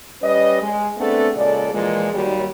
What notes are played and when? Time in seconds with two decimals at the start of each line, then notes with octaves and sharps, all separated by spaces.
0.22 G3 C#4 B4 D#5
0.61 G#3
0.97 A3 B3 C4 D4 G#4 A4
1.36 A#2 C#3 G#3 A4 D5
1.72 A#2 E3 F3 G#3
2.13 D#2 F#3 G3